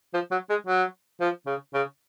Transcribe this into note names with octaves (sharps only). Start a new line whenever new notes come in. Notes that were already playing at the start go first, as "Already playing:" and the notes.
F3
F#3
G#3
F#3
F3
C#3
C#3